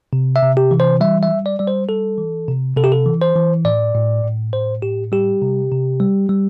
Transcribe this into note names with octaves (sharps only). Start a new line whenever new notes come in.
C3
E5
C3
G4
E3
C5
G3 E5
E5
G3
D5
G3 D5
C5
G3 A4
E3
C3
C3 A4
G4
A4
E3
C5
E3
A2 D5
A2
A2
A2 C5
A2 G4
G3 G4
C3
C3
G3
G3